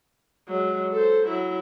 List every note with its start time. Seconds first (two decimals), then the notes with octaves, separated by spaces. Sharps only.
0.48 F#3 G#3
0.93 A4 C5
1.27 F#3 E4